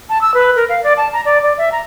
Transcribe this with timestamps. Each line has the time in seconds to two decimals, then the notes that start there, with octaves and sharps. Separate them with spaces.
0.09 A5
0.21 E6
0.34 B4
0.56 A#4
0.69 F5
0.84 D5
0.97 A5
1.13 A#5
1.25 D5
1.43 D5
1.58 E5
1.72 A#5